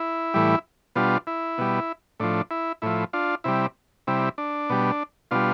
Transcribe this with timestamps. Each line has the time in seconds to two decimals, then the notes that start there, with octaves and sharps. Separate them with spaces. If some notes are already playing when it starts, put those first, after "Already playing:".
Already playing: E4
0.34 A2 E3 G3
0.95 B2 G3 D4 F4
1.27 E4
1.58 B2 G3
2.20 A2 F3 D4
2.51 E4
2.82 A2 F3 E4
3.13 D4 F4
3.44 C3 G3 E4
4.07 C3 G3 E4
4.38 D4
4.70 B2 G3
5.31 B2 G3 D4 F4